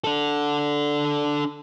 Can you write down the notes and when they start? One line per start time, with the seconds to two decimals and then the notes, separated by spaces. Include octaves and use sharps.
0.04 D4 A4